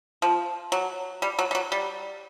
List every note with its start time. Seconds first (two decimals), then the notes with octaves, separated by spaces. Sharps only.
0.22 F3
0.72 F#3
1.22 G3
1.39 F#3
1.51 G3
1.55 F#3
1.72 G3